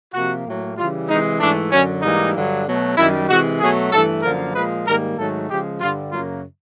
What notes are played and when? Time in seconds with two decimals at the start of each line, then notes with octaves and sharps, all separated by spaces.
0.13 C3 F3 A#3 F#4
0.45 A2 F#3 A#3
0.76 C#3 E3 G3 F4
1.08 C3 E3 G#3 D#4
1.40 G#2 E3 A3 D4
1.71 F#2 D3 F#3 C#4
2.02 G#2 E3 G3 A#3 D#4
2.34 G2 D3 F#3
2.66 B2 F#3 A3
2.96 F#2 D#3 G3 E4
3.28 C3 E3 G#3 F#4
3.60 B2 F#3 A3 G#4
3.91 G2 E3 A3 A4
4.22 F#2 D3 F3 A#3 A#4
4.54 A#2 F3 G#3 B4
4.85 G#2 D#3 G3 A#3 A#4
5.17 G#2 D#3 F#3 A3 A4
5.49 C#3 F3 G#3 G4
5.80 G2 D3 G3 F4
6.12 F#2 C#3 F#3 A#3 F4